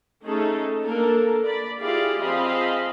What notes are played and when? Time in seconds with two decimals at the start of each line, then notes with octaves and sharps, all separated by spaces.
0.24 A3 C#4 D#4 G#4 A4
0.84 A#3 D4 A4 A#4
1.43 D5 B5
1.80 E4 F4 G4 G#4 D5 F5
2.19 F3 C4 G#4 D#5 F5 B5